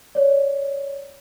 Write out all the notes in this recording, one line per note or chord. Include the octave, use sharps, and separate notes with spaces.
C#5 D5